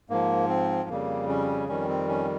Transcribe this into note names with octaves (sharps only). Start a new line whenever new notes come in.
G#2 F3 A#3
C4
F2 C#3 G3 A#3
C#4
F2 D#3 G3 C#4
C4
C#4